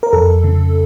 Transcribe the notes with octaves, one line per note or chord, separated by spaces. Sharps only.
A#4
F2 A4
C#3